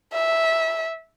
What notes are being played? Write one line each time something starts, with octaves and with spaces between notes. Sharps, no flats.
E5